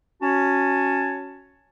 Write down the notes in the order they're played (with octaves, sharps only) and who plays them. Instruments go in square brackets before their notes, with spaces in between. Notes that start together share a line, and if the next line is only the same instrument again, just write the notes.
[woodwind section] C#4 F#4 C#5 A5